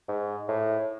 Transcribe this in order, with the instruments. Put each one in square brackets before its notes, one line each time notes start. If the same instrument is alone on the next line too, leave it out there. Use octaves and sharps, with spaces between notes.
[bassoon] G#2
A2